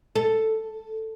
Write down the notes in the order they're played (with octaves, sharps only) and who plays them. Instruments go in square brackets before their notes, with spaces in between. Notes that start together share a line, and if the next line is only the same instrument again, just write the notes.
[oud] A4